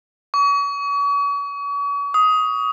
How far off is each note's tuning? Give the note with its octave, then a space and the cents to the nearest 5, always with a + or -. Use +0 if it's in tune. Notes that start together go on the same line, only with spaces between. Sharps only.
C#6 +40
D#6 +15